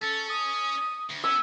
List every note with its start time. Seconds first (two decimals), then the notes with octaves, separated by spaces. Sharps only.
0.02 C#4 A4
0.30 D#6
1.10 D2
1.24 B3 C#4 E6